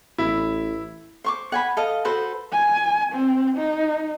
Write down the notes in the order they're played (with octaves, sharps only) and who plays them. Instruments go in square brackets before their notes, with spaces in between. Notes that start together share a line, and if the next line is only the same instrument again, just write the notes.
[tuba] A1 [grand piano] E4
[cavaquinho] C5 C#6 D6
F#5 G#5 B5
A4 D#5 F5
F#4 A4 B4 C5
[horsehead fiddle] G#5
C4
D#4